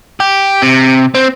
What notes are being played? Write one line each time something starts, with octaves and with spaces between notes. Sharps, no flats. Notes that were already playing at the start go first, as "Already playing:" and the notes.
G4
C3
C4